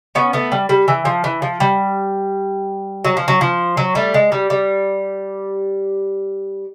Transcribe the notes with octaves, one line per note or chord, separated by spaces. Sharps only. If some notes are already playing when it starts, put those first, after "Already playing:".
B3 C#4
A3 B3
G3
G3
E3
F3
E3
F3
G3
F#3
F3
F#3
F3
F#3
G3 A3
G#3
G3
G3